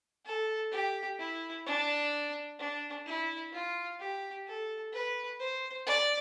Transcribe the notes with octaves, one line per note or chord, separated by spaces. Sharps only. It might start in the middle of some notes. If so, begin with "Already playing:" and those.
A4
G4
E4
D4
D4
E4
F4
G4
A4
B4
C5
D5